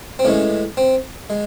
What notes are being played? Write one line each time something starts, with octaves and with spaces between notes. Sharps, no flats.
C4
A2 E3 G#3 C#4
C4
G#3